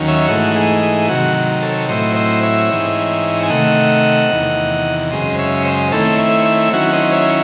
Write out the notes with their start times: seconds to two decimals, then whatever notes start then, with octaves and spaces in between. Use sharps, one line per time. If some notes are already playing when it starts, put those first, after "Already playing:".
Already playing: D#2 D#3 F#3 C#4
0.08 C#5 E5
0.28 G#2 E3 A3 D#4 F#4
0.56 G#4
0.82 G#4
1.08 C3 D#3 F#3 F#4
1.62 A4 C#5
1.89 A2 F#3 C4 E4 C5 D#5
2.16 C5 D#5
2.43 C#5 E5
2.70 G#2 E3 C4 D#4
3.43 G#5
3.50 C3 D#3 A3 D#5 F#5
4.31 E2 C3 D#3
5.11 F#2 C#3 G#3 C5 D#5
5.39 C#5 E5
5.65 C5 D#5
5.92 D#3 A3 C4 E4 A4 C#5
6.18 C#5 E5
6.45 C#5 E5
6.73 D#3 F#3 C#4 E4 F#4
6.93 C5 D#5
7.12 C#5 E5